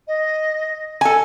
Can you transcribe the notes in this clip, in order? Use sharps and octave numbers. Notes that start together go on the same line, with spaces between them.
D#5
A4 G#5 A5